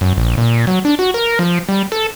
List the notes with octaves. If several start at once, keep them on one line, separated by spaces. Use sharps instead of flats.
F#2
A#1
A#2
F#3
D4
F#4
A#4
F3
G3
A4